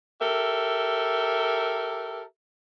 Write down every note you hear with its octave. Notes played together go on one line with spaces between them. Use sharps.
G4 A4 A#4 E5